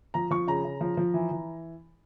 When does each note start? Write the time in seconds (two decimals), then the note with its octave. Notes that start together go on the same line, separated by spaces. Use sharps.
0.14 F3 A#5
0.31 F3 C#6
0.47 C#3 A#5
0.65 C#3
0.81 F3
0.97 F3
1.14 E3
1.31 E3